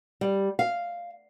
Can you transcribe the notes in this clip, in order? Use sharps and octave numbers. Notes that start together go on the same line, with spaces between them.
G3
F5